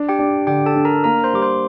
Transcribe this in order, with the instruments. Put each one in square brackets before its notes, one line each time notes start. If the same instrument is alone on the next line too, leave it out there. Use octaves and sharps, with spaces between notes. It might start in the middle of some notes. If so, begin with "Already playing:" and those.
Already playing: [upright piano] D4
[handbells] G4 G5
[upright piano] D4
[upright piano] D3 [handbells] G4 G5
[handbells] A4 A5
[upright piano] D4
[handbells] A#4 A#5
[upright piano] A#3 [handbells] A#4 A#5
[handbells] C5 C6
[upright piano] G3 [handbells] D6
[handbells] C5 C6